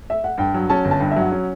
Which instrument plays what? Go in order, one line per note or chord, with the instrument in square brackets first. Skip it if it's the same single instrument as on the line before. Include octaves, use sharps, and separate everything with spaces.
[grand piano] E5
F#5
[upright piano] G2 [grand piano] G5
[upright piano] F#3
[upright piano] C#4 [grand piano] A5
[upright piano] G1
[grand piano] A5
[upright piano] G2 [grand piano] G5
[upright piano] F#3 [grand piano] E5
[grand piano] F#5
[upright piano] C#4